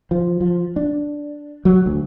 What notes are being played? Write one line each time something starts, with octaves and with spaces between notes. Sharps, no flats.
F3
F3
D4
F#3
D2